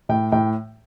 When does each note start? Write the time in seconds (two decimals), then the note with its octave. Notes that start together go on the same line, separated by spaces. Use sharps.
0.09 A2 G5
0.32 A2 G5